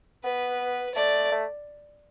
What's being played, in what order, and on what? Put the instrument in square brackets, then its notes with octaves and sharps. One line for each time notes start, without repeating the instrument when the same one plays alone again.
[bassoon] B3 [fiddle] B4
[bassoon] A3 [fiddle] D5
[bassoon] A3